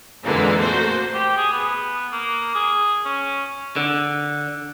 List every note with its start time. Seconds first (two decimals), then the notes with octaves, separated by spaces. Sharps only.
0.25 F2 A#2 D3 E3 G#3 A#3
0.61 A3 A#3 F#4 C5
1.14 G4
1.37 G#4
1.52 B3
2.12 A#3
2.55 G#4
3.05 C#4
3.76 D3